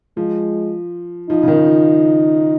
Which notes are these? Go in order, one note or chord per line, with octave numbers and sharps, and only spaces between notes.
F3 G#3
F3 D#4
C#3
D#3
F3